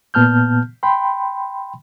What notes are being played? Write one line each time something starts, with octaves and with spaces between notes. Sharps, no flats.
A#2 B3 A5 F6 G6
G5 B5 C6